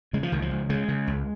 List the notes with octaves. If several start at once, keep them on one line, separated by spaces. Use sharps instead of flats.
C#3 G#3
F3
C#2 D#3
F3
C#2
C#3 G#3
C#3
C#2